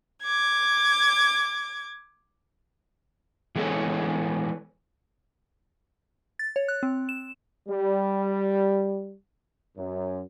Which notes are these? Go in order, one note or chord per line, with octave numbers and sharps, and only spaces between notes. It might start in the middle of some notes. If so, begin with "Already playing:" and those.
D6 G#6
E3 G#3 B3 G#4 A4 C#5
A6
C#5
F#6
C4
E7
G3
F#2